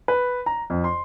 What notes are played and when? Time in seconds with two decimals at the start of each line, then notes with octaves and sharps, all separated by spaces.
0.08 B4
0.46 A#5
0.70 F2
0.84 C6